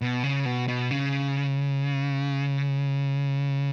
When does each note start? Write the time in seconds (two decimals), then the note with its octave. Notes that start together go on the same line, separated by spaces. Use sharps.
0.02 B2
0.23 C#3
0.45 B2
0.68 B2
0.91 C#3